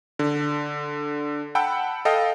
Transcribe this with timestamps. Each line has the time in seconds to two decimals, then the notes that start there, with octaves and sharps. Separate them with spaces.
0.19 D3
1.55 F#5 G5 A5 B5 E6
2.05 A4 D#5 F5 G5